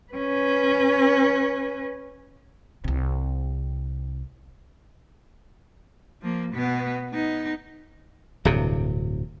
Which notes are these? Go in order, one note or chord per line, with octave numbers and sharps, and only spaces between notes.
C#4 B4
C2 C3
F3 A#3
B2 B3
B3 D#4
D1 G2 C3